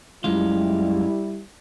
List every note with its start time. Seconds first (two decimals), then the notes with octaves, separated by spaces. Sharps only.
0.24 F#2 G3 G#3 E4 F4